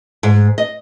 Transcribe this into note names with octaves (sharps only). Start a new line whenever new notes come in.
G#2
D#5